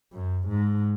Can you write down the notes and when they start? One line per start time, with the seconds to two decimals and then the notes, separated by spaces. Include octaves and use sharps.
0.13 F#2
0.48 G#2